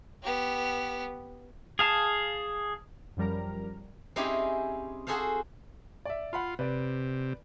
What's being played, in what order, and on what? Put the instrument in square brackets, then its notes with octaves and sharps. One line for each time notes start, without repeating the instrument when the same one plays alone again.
[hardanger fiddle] B3 G4
[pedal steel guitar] G#4 F5 A5
[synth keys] F#2 F3 G3 A#4 A#5
[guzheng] C4 C#4 D#4 E4 G4 G#4
F#4 G#4 A4 C5 F5
[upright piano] D5 E5
[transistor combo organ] F4 [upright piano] F#5 B5 C6
[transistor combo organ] C3 [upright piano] B4 D5